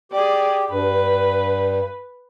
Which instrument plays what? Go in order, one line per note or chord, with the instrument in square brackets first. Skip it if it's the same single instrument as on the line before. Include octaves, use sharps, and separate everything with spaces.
[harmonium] G4 [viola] G#4 D5
[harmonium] G2 [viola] B4